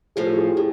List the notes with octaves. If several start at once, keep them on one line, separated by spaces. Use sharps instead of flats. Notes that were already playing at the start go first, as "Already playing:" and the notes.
A2 F3 A3 G#4
A4
G#4
G4
A2 G#4